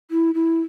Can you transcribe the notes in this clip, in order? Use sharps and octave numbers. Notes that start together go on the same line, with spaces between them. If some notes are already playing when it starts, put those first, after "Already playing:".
E4
E4